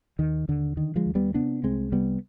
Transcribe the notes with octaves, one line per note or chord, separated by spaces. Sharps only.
D#2 D#3
D#2 D3
D3 D#3
F3 G#3
D#2
G3 B3
C3 B3 D4
C2 G#3 C4
C3 G3 B3